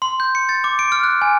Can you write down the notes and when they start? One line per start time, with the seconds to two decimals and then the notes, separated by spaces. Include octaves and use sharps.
0.02 C6
0.20 G6
0.35 C#7
0.49 A6
0.64 D6
0.79 D7
0.92 F6
1.04 F#6
1.22 G#5